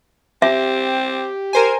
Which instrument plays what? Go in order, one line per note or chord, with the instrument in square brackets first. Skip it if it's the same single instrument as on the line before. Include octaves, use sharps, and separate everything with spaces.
[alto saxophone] C4 [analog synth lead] G4 [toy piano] E5
[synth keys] A#4 C5 G#5